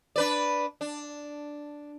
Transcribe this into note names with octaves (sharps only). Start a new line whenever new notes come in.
D4 B4 D5
D4